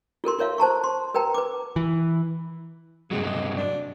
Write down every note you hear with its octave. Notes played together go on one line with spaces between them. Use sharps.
F4 A4 A#4 C6
F4 A#4 C#5 E5 F5
C5 A5 A#5 C#6
C6
A#4 B4 G5 A#5
B4 D6
E3
G2 C3 F#3 G#3
D#5
D4